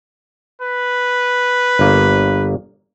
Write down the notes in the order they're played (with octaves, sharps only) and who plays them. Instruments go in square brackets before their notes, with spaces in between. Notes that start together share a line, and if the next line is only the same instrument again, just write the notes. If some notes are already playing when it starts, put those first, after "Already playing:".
[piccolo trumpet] B4
[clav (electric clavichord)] G1 A#3